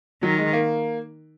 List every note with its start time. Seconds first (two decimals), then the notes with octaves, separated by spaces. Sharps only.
0.22 D#3 F#3
0.38 G#3
0.53 A#3